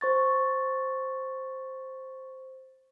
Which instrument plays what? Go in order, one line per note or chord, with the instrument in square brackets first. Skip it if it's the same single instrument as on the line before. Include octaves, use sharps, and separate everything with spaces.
[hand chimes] C5 C#6 A6